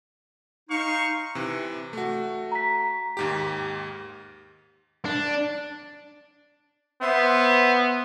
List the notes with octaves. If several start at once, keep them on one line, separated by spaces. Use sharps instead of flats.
D#4 C5 F5 C#6
C3 E3
A3 F#4
A#5 B6
D#2 G#2 G4
D4
B3 C5 E5